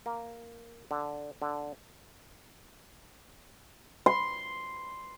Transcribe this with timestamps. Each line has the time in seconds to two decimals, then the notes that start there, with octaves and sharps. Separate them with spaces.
0.06 A#3
0.91 D3
1.42 D3
4.06 C6